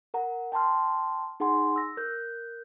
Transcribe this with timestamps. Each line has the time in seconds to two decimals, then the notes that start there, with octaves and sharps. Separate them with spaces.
0.14 A#4 F#5 A#5
0.52 G5 A5 A#5 C6 F6
1.40 D#4 G#4 F#5 G#5 C6
1.76 E6 A#6
1.97 A#4 F#6 G6